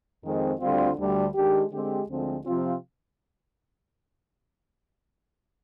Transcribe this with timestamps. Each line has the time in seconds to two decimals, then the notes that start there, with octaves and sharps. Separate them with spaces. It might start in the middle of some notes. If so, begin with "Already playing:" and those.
0.24 F2 D#3 G#3 C4
0.61 D2 D3 G3 C4 F4
0.98 D2 D3 G3
1.34 D#3 G#3 D4 G4
1.72 D3 G#3 C4 G4
2.08 D2 D3 F3 G#3 C4
2.46 C3 F3 C4 F4